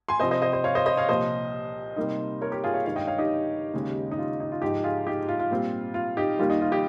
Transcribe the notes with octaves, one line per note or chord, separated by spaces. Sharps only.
G#5 C6
C3 F3 C4 C5 D#5
C5 D#5
C5 D#5
C5 D#5
C#5 F5
C5 D#5
C5 D#5
C#5 F5
C2 A#2 F3 C5 D#5
C3 G3 A#3 D#4
A#4 C#5
G4 A#4
F4 G#4
C#5 F5
G2 D#3 G#3 C#5 F5
D#5 G5
C#5 F5
D#4 G4
D#2 C#3 G#3 C#4
D#4
F4
D#4
F4
G#2 F3 G#3 D#4 G4
F4 G#4
D#4 G4
F4
F4
A#2 G3 C4
F4
D#4 G4
D#2 D#3 G3 A#3 F4
D#4
F4
D#4 G4